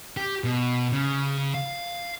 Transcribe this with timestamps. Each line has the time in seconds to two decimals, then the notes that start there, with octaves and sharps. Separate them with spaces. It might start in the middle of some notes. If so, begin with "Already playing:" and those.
0.17 G4
0.44 B2
0.92 C#3
1.54 F5